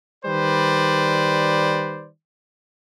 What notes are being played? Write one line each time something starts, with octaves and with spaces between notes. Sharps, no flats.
D#3 G3 B4 C5 D5